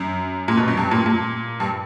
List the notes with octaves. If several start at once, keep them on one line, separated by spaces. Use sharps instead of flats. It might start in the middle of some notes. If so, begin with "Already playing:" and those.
Already playing: F#2
A#2
B2
F#2
G2
A#2
A#2
G2